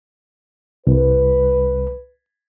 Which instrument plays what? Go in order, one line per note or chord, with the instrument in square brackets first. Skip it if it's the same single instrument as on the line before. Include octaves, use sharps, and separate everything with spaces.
[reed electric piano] C2 [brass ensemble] B4